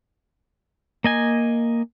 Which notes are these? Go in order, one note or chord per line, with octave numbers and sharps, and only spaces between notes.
A#3 D#5 G#5